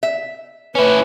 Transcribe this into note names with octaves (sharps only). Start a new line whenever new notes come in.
E5
C#4 E4 B4